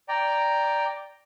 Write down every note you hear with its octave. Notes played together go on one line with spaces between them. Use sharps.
D5 G5 A#5